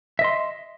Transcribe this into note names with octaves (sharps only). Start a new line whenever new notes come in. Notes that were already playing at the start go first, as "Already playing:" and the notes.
D#5 E5 C6